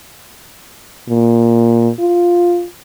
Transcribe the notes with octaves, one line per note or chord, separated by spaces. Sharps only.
A#2
F4